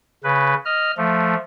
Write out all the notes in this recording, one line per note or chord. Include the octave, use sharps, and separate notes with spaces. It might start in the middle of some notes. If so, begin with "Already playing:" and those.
C#3 B4
D#5 F6
F3 A3